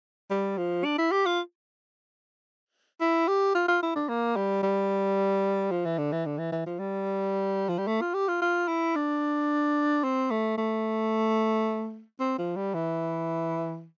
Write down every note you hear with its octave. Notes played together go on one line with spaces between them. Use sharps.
G3
F3
D4
E4
G4
F4
E4
G4
F4
F4
E4
D4
A#3
G3
G3
F3
E3
D3
E3
D3
E3
E3
F3
G3
F3
G3
A3
F4
G4
F4
F4
E4
D4
C4
A3
A3
C4
F3
G3
E3